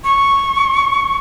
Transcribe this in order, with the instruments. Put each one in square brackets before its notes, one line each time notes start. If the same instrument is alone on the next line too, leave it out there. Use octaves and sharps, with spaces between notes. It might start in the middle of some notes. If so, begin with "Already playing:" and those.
[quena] C#6